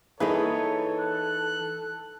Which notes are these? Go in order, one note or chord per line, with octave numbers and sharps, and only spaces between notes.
E3 A#3 D#4 E4 G#4 A4 B4 C#5
F#6